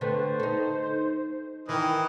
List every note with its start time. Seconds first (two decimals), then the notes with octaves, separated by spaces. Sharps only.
0.01 D3 A3 B3 C5
0.40 D#4 A4
1.69 D#3 E3 A#4 D#5